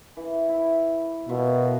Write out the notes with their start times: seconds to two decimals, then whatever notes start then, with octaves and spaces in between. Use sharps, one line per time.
0.17 E3
0.49 E4
1.29 B2 F4 A#4 E5